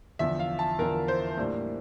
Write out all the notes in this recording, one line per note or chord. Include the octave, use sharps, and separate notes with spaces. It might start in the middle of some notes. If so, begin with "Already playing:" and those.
E2 D3 F3 E5
F5
A5
E2 D3 F3 A#4
C5
A2 G3 A#3 D4